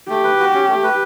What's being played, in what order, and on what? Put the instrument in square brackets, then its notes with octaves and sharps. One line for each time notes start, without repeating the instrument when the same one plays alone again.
[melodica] A3 [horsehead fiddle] G4
[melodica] B4
F#4
C#4
A3
B4